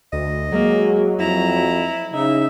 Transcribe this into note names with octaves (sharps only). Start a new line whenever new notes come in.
D2 D#5
F#3 G#3 A#3
F2 E4 A#5
C#3 D#4 E5